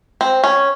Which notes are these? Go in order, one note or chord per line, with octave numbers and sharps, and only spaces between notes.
C4
C#4